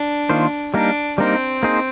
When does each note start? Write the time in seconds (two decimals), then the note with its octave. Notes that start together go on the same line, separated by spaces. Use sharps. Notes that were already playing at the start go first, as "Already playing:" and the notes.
Already playing: D4
0.30 D#3 A#3 F4 C5
0.74 G3 A#3 D4 D#4 A#4
1.18 G3 A#3 C4 D#4 A#4
1.63 A#3 D#4 G#4 C5